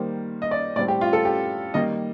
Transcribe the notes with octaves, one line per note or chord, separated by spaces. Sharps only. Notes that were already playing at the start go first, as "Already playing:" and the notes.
Already playing: D#3 G3 A#3 C5
D#5
D5
A2 G3 C4 D5
G4
F4
A4
G4
D#3 G3 A#3 D#5